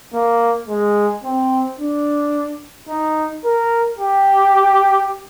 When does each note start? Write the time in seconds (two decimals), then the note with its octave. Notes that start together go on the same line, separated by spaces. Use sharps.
0.14 A#3
0.68 G#3
1.24 C4
1.79 D4
2.88 D#4
3.44 A#4
3.99 G4